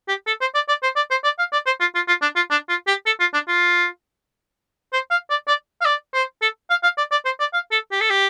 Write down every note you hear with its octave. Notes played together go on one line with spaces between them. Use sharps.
G4
A4
C5
D5
D5
C5
D5
C5
D5
F5
D5
C5
F4
F4
F4
D4
F4
D4
F4
G4
A4
F4
D4
F4
C5
F5
D5
D5
F5
D5
C5
A4
F5
F5
D5
D5
C5
D5
F5
A4
G4
A4
G4